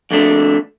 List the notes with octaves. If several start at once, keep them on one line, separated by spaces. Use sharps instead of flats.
F2 D3 A3 D4